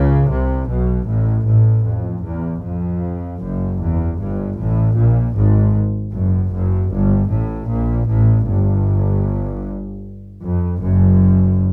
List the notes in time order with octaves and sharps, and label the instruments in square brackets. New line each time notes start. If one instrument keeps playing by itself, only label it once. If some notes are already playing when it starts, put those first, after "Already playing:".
Already playing: [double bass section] C#2 C#3
C2 C3
B1 B2
A1 A2
A1 A2
F2
E2
F2
F#1 F#2
E2
G1 G2
A1 A2
A#1 A#2
G#1 G#2
F#1 F#2
F#1 F#2
G1 G2
A1 A2
A#1 A#2
A1 A2
G1 G2
F2
F#1 F#2